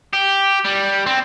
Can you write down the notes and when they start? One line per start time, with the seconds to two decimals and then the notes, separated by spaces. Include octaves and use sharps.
0.13 G4
0.65 G3
1.06 C4